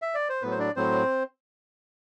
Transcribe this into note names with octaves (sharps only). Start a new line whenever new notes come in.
E5
D5
C5
A2 F#3 B3 B4
C5
D4 D5
A2 F#3 C4 C5